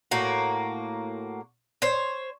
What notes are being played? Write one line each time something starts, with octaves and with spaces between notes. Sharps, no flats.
A2 A#3 F#4
C5 C#5